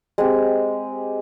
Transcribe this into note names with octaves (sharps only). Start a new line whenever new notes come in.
G#3 C4 G4